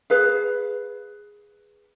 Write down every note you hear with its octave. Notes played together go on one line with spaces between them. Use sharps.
G#4 B4 F5